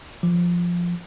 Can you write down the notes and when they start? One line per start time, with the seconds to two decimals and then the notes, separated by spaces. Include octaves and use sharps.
0.23 F3